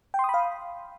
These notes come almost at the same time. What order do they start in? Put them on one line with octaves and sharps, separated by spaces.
G5 C6 D#6 B5 F5